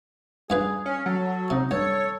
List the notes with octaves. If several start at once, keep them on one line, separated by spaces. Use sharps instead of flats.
G2 F4 G#4 B4
C#4 F5
F#3 A4
C3 D#4
G2 A4 C#5